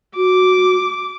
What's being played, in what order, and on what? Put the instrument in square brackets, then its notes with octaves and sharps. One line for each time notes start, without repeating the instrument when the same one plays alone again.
[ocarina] F#4 [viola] D6